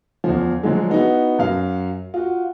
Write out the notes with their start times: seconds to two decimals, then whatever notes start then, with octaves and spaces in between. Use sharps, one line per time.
0.24 E2 D3 F3
0.63 D3 F3 F#3 G#3
0.90 B3 D#4 E4 F#4
1.39 F#2 F#3 F5
2.14 F4 F#4